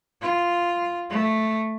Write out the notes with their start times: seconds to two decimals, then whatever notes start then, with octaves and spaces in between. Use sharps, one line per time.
0.21 F4
1.10 A3